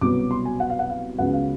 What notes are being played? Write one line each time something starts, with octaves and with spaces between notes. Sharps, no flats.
C2 B2 F#3 B3 D6
C6
G#5
F#5
F5
F#5
F5
C#2 C#3 F#3 B3 F#5
F5